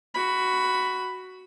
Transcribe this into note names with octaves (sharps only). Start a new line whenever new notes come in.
F#4 B5